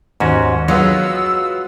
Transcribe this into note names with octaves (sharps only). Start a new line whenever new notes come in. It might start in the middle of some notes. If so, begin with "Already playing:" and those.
D#2 G#2 C#4 F#4
F#3 G#3 B3 F4 F#4 E6